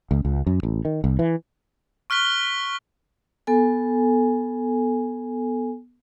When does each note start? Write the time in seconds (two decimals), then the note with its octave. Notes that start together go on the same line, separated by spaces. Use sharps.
0.11 C#2
0.25 C#2
0.47 F#2
0.63 A1
0.85 D#3
1.04 C2
1.19 E3
2.10 C#6 F6 F#6 B6 G7
3.47 B3 A4 G#5